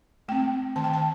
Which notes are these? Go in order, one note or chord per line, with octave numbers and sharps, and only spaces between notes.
A3 C4 G5
D#3 A5
G5
A5